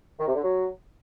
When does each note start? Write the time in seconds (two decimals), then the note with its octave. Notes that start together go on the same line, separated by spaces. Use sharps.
0.18 D#3
0.27 C3
0.35 D3
0.43 F#3